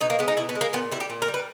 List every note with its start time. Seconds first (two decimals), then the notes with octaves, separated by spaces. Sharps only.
0.01 B2 D#4
0.10 A#3
0.19 G#3 B3
0.28 D#4
0.37 B2 E4
0.49 B3
0.55 G#3
0.61 A#3
0.73 A#2 B3
0.92 G3 E4
1.00 G4
1.10 A#2
1.22 A#4
1.28 G3
1.34 B4